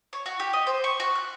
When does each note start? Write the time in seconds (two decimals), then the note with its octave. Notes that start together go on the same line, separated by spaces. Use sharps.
0.13 C#5
0.26 F#4
0.40 G4
0.53 D#5
0.67 C5
0.84 C#6
1.00 F#4
1.15 F#6